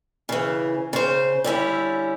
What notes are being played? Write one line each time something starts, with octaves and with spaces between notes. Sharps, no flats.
C#3 E3
C#3 C5
D3 G3 C#4 E4